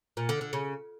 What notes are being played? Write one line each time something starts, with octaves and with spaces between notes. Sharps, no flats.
A#2
D3
D3
C#3